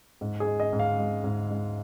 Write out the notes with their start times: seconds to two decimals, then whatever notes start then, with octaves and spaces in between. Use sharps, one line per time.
0.21 G#2
0.40 G#4
0.47 G#3
0.60 D#5
0.73 G#2
0.79 F5
0.99 G#3
1.24 G#2
1.51 G#3